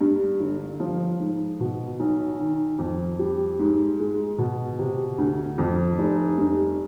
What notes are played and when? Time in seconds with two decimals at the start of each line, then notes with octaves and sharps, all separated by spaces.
0.01 G2
0.40 G1
0.80 F3
1.20 G#2
1.60 B2
2.00 B1
2.39 D#3
2.79 F2
3.19 G3
3.59 G#2
3.99 G#3
4.38 B2
4.79 C3
5.18 D2
5.58 F2
5.98 F1
6.38 G2